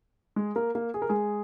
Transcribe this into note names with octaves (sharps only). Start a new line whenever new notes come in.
G#3 G#4
A#3 A#4
A#3 A#4
G#4
A#4
G#3 G#4